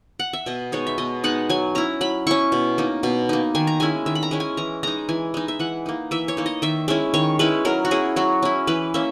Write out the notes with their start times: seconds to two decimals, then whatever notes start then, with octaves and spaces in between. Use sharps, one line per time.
0.19 F#5
0.33 E5
0.46 B2 D#5
0.72 G#3 B3 D#4 C#5
0.87 E5
0.98 B2 D#5
1.24 G#3 B3 D#4 F#5
1.49 F#3 G#5
1.75 C#4 E4 A#5
2.01 F#3 B5
2.27 C#4 E4 C#6
2.52 B2
2.78 A#3 D#4
3.03 B2
3.29 A#3 D#4
3.55 D#3 G#5
3.67 A#5
3.80 G#3 C#4 E4 G#5
4.06 D#3 E5
4.15 B5
4.23 A#5
4.31 G#3 C#4 E4
4.40 G#5
4.57 E3 A#5
4.83 G#3 D#4 A#5
5.09 E3 G#5
5.34 G#3 D#4
5.48 E5
5.59 E3 F#5
5.86 A#3 D#4
6.11 E3 E5
6.28 C#5
6.37 A#3 D#4
6.46 D#5
6.62 D#3 E5
6.88 G#3 C#4 E4 E5
7.14 D#3 C#5
7.39 G#3 C#4 E4 B4
7.65 F#3 A#4
7.85 F#4
7.91 C#4 E4 G#4
8.16 F#3 F#4
8.42 C#4 E4
8.67 E3 B4
8.94 A#3 C#4 E5